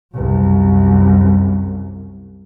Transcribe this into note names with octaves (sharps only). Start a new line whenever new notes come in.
C2 F#2